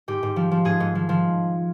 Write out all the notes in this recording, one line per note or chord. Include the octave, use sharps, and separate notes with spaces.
G#2 G4
G#2
F3
F3
G#2 G#4
G#2
F3
F3